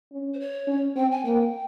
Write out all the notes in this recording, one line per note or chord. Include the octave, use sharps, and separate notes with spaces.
C#4
C5
C#5
C#4
C4 G5
G#5
A#3 G5